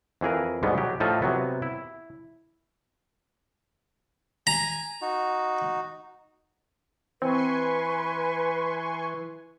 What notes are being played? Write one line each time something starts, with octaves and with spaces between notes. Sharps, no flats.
F2 E3 G#4 A#4
D2 G#2 B2 G3 G#3 B3
F#3 G4
A2 F3 D#4 F4 E5
C3 F#3 B3
E4
G#5 A#5
D#4 F#4
E3 C4 B4 G#5 C6 C#6